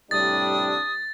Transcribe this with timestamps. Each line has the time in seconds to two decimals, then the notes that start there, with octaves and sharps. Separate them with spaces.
0.11 A2 C3 G3 D4 D#6 A6